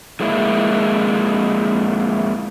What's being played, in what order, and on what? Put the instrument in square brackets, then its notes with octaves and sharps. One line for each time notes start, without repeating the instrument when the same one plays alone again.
[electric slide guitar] F2 G#3 A#3 E4